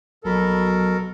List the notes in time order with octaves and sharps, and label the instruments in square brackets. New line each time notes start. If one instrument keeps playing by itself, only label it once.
[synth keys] A#1 F#3 B5 [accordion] B2 A4 A#4